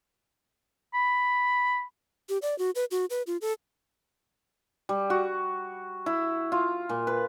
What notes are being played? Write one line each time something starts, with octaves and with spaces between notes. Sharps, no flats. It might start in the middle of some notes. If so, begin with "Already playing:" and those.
B5
G4
D5
F#4
B4
F#4
B4
F4
A4
G3
F#4
E4
F4
A#2
B4